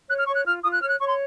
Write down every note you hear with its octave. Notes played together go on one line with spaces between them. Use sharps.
C#5 F#6
F6
C#5 C#6
F#6
F4 F6
F4 D#6
F#6
C#5 F6
F#6
C#5 C#6
C6